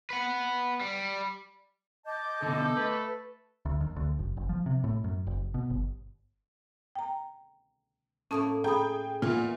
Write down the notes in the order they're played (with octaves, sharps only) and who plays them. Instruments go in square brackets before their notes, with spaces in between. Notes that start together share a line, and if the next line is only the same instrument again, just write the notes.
[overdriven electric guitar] B4 F#5
G3
[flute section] D#5 D6 G6 [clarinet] A5
[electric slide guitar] B2 D3 [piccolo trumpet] A4
[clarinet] A3 [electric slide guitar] B4
[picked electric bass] D2
D#2
D2
F#1
F#1
F3
C3
A2
F#2
F#1
B2
G1
[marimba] G5 A#5
[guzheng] A2 A3 A#3 [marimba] C#4 A5 D#6
[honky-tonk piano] G#4 G5 [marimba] A#5 B5 D#6
[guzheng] E2 E3 [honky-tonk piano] A#2 [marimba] F4